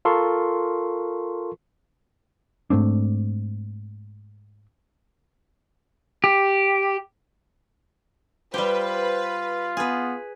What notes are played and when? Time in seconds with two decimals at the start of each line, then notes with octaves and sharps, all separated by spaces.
0.05 F4 A4 A#4 C6 C#6
2.70 G#2 A3 C4 D4
6.24 G4
8.54 G3 F4 G4 B4 C5
9.77 B3 G#4 B4